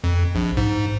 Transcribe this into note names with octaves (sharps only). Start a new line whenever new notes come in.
F2
A#1
G#2